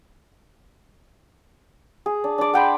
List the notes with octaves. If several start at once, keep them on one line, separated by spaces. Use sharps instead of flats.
G#4
D4
D4 D5
F#5 G5 B5 C6